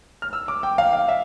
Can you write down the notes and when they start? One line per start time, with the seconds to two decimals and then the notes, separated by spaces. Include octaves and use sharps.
0.22 F6
0.33 E6
0.48 D6
0.63 G5
0.78 F5
0.93 F5
1.09 E5